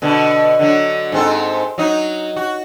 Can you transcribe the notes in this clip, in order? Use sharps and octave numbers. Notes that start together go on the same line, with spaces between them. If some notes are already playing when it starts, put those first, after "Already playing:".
B2 D3
D3 F#3
G#2 C4 A4
F#3 D#4
F#4